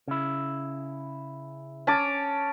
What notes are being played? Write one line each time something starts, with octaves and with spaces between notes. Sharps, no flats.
C#3 E4
C#4 A5 D6